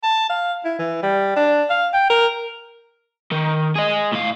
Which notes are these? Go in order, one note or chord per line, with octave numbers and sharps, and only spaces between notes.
A5
F5
E4
E3
G3
D4
F5
G5
A#4
D#3
G#4 D#5
A2 F5